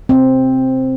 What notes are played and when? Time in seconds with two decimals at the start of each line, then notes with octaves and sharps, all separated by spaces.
0.09 C4